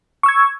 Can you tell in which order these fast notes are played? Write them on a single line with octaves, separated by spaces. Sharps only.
C#6 E6 G#6